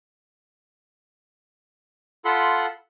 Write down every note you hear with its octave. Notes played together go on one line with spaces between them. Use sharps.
F4 A4 F#5 B5 C6